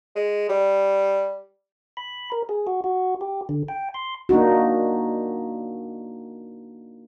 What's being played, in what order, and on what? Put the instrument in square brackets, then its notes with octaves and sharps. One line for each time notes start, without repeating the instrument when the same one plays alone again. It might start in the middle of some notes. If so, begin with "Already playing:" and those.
[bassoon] G#3
G3
[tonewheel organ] B5
A#4
G#4
F#4
F#4
G4
D3
G5
C6
[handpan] A#3 D4 D#4 F#4